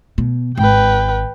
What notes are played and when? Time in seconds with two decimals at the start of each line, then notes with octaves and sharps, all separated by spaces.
0.18 B2
0.57 G#1 B4 G5